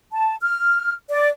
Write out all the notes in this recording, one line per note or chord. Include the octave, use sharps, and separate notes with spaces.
A5
F6
D5